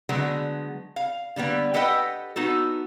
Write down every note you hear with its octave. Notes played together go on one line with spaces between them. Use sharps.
D3 F#3 G#3 A3 B3
F5
D3 G3 A#3 B3
G4 A4 B4 D#5 F#5 G5
B3 D#4 F#4 A4